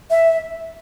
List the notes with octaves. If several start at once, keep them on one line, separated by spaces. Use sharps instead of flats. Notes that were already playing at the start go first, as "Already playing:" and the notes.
E5